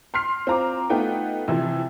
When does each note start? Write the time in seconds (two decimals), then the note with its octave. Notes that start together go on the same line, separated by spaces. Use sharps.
0.14 C6 F6 C7
0.47 C4 F4 A#5 D6
0.90 A3 B3 D#4 F4 G5
1.48 C3 E3 F3